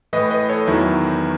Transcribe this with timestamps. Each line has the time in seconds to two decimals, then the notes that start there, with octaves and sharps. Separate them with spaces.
0.13 A2 E3 B4 D#5
0.30 B4 D#5
0.49 A4 C#5
0.67 E2 D#3 F#3 E4